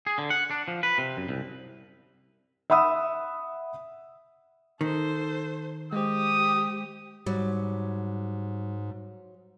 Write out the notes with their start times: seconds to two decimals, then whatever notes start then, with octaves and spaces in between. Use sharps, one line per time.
0.07 G#4
0.18 D3
0.30 F#5
0.50 D4
0.68 F3
0.83 B4
0.98 C3
1.17 F#2
1.29 C2
2.70 E5 F#5 B5 D#6 E6
4.81 D#3 A4 C5
5.93 G#3 G4 C5 D#6
7.26 G#2 F#3 G3